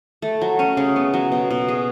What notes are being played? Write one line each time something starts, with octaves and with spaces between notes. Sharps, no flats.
A3
F#3
C#4
C#3
B3
F#3
B2
B2
G#4